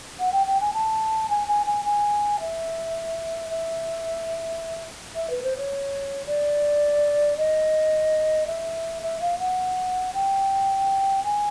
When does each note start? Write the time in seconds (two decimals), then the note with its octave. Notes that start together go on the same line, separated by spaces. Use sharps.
0.20 F#5
0.32 G5
0.47 G5
0.61 G#5
0.74 A5
1.30 G#5
1.48 G#5
1.66 G#5
1.85 G#5
2.40 E5
3.50 E5
5.16 E5
5.30 B4
5.43 C5
5.57 C#5
6.26 D5
7.38 D#5
8.47 E5
9.03 E5
9.21 F5
9.39 F#5
10.14 G5
11.24 G#5